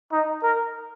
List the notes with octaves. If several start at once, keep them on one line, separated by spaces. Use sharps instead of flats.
D#4
A#4